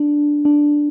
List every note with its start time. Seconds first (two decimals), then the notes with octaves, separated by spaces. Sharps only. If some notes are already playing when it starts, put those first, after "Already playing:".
Already playing: D4
0.45 D4